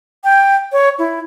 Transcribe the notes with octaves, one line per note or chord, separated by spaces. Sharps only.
G5
C#5
E4